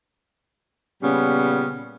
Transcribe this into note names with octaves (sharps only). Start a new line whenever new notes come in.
A#2 C#3 G3 B3 C#4